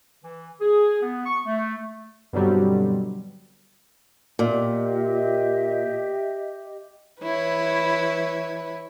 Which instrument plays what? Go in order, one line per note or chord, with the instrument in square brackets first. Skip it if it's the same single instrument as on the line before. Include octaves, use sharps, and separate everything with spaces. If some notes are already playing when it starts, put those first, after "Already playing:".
[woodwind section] E3
G#4
B3
C#6
A3
[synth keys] G2 B2 D3 F#3 G3 C4
[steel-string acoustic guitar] A#2 [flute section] G4 D#5 E5
[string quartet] E3 E4 B4 C#5